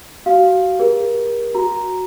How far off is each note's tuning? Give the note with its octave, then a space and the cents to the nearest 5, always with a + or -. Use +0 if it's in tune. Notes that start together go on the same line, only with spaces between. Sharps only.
F#4 +25 F5 +0
G4 +45 A#4 +30
F#4 +0 A#5 +0